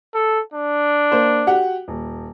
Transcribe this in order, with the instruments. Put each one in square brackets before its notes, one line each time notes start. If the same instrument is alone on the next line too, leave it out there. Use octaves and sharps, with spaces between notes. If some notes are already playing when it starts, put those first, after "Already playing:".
[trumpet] A4
D4
[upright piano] A#3 C5
F#4 G4 F#5
D#1